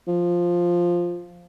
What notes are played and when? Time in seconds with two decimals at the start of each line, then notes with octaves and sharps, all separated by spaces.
0.07 F3